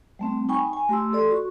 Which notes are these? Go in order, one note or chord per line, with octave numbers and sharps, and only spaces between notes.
G3 A3 C4
D#4 G5 G#5 B5 C#6
G#5
A3 G4 C6 E6
A4 D5 C6
F#4 C#6